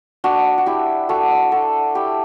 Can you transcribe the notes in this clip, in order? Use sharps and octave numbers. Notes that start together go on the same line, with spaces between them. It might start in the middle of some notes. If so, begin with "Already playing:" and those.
D4 F#4
F#4
E4 G4
F#4 A4
F#4 A4
E4 G4